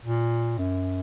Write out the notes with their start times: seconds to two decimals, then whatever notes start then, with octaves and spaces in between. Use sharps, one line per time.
0.05 A#2
0.58 F#2